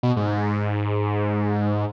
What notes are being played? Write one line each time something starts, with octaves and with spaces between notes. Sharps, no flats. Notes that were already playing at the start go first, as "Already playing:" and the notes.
B2
G#2